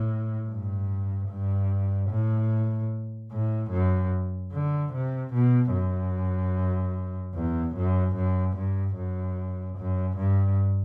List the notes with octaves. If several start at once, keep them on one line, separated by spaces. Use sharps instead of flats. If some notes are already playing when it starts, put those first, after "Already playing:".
Already playing: A2
G2
G2
A2
A2
F#2
D3
C3
B2
F#2
E2
F#2
F#2
G2
F#2
F#2
G2